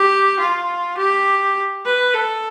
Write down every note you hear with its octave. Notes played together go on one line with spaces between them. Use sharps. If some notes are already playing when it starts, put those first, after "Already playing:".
Already playing: G4
F4
G4
B4
A4